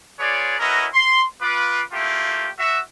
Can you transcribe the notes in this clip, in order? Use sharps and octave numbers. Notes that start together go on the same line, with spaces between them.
F4 G#4 B4 C#5 D5
C#4 E4 F#4 A#4 B4 D#5
C6
F4 B4 D6
A3 A#3 E4 F4 G4
F#4 E5